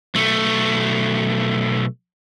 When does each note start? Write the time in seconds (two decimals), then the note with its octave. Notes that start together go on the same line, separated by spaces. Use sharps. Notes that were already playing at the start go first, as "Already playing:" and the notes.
0.15 B1 A3